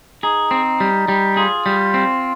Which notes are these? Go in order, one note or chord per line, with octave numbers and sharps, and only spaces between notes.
D#4 G#4
C4
G3
G3
F4 G#4
G3
C4